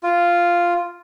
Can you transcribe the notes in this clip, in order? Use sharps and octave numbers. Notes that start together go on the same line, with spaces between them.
F4